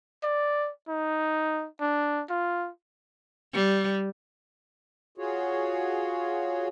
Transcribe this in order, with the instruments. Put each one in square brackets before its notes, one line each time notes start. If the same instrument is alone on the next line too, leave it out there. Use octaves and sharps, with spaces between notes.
[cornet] D5
D#4
D4
F4
[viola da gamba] G3
[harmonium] F4 F#4 G#4 C#5